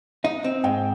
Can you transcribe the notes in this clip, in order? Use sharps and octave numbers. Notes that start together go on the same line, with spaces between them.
D#4 D#5
C4
G#2 G5